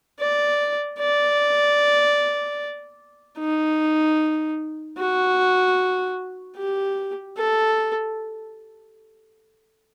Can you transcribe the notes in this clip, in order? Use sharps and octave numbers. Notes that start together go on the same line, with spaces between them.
D5
D5
D#4
F#4
G4
A4